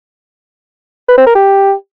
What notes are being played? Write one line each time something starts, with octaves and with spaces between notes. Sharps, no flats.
B4
C4
A#4
G4